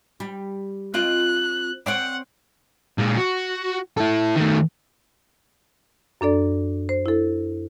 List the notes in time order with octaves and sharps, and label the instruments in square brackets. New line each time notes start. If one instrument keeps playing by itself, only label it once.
[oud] G3
[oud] C4 F4 D#5 [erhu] F#6
[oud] C4 C#5 D5 [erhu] F#5
[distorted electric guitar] A#2 G#3
F#4
E4 A4
D#3 A3
[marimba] F#2 D4 A4 D5
C5
E4 A4